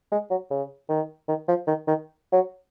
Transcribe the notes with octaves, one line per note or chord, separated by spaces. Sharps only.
G#3
F#3
C#3
D#3
D#3
F3
D#3
D#3
F#3